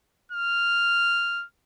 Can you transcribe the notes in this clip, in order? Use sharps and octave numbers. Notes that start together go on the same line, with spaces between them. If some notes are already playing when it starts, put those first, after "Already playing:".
F6